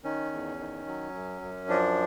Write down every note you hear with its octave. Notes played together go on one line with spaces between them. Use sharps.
D#3 C#4
E2
D#3
F#3
F#2
F#2
F3 D4